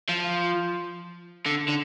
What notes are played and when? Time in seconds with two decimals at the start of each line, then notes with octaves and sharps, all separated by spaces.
0.09 F3
1.46 D3
1.69 D3